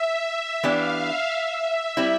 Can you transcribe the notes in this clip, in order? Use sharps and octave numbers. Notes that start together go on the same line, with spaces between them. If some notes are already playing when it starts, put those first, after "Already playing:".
Already playing: E5
E5
E3 B3 D4 G4 F5
E5
E5
G3 C4 E4